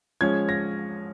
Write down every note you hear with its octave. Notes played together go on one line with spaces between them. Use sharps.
F3 G#3 C#4 G#6
A#6